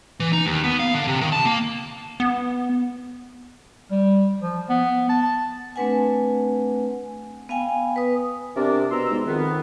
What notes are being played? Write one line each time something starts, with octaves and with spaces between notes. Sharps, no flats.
E3
D#4
D#2
B3
F5
D3
C3
D#3
A5
A#3
B3
G3
F3
B3
A5
A3 C4 D4 B4 F#5 G#5
B3 F5 G5 G#5
B4 D#6
C3 D4 A#4 D5
B2 A#5 C6 E6
G#2
F2 D#3 B3